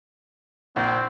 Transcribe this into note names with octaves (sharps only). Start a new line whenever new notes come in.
A#1 C4